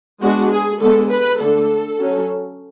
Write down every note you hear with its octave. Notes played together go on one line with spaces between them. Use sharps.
G#3 B3 D4 F#4
G#4
D3 G#3 B3 A4
B4
D3 A3 D4 A4
F#3 C#4